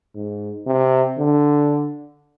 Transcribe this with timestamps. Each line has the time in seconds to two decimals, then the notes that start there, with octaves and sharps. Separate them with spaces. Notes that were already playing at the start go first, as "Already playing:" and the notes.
0.15 G#2
0.66 C3
1.18 D3